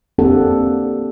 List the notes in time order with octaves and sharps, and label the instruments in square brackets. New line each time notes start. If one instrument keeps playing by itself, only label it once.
[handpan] A#3 C4 D4 G4 A4 F#5